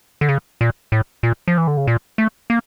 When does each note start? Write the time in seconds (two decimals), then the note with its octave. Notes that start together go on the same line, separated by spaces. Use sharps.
0.21 D3
0.29 C#3
0.61 A#2
0.92 A2
1.23 A#2
1.48 F3
1.58 E3
1.67 D3
1.77 C#3
1.87 A#2
2.18 A3
2.50 A#3